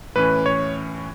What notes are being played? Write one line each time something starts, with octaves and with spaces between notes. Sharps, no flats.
A2 E3 C#4 B4
C#5